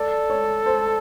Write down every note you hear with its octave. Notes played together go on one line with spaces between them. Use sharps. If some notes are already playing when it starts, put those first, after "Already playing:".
Already playing: A4 D5
C#5
C5